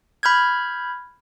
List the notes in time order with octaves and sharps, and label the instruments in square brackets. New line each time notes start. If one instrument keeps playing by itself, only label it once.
[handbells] B5 F6 G6 G#6